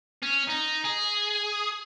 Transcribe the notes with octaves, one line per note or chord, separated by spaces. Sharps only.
C#4
D#4
G#4